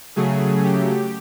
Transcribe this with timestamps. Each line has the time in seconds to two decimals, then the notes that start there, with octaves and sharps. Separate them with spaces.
0.16 C#3 F#3 A3 G#4
0.64 G4